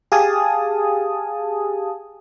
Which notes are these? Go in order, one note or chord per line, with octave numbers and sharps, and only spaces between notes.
G4 G#4 F5 G#5 A5 D#6